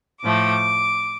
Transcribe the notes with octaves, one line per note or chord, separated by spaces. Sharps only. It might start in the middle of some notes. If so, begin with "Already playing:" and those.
A2 F3 A3 D6